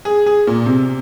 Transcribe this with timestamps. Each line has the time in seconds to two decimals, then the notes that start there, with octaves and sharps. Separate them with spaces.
0.05 G#4
0.26 G#4
0.47 A#2
0.66 C3